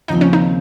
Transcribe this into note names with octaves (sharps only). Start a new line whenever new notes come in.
D#2 C#3 F3 C4 D#4
C#4
D#4